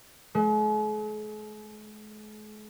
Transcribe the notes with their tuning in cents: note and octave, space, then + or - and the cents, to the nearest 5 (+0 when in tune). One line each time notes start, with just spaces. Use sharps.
G#3 +45